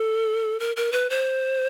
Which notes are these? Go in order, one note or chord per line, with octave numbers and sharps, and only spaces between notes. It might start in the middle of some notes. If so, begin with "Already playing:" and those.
Already playing: A4
A#4
A#4
B4
C5